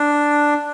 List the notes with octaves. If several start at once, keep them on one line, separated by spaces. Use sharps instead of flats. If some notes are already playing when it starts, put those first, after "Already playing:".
Already playing: D4